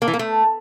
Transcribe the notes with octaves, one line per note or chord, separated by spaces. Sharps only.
A#3
E3
A#3
A3